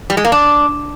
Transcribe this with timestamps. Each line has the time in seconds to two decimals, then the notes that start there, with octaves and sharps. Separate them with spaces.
0.10 G3
0.17 G#3
0.25 A#3
0.32 D4